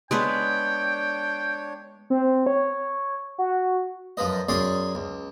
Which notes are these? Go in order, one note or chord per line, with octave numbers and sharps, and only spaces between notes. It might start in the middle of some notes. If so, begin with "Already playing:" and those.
G#3 B3 D4 B4 C#5 G5
C4
C#5
F#4
F#2 F3 B4 D#5
F#2 C#4 G#4 D5 C6
C#2